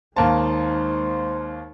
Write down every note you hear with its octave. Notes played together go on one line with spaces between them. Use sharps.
D#2 G#3 A#3 D#4 C5 A5